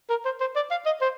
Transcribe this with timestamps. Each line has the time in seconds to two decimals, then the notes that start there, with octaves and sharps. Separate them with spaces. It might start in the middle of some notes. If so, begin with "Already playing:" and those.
0.10 A#4
0.25 C5
0.40 C5
0.56 D5
0.71 F5
0.86 D#5
1.01 C5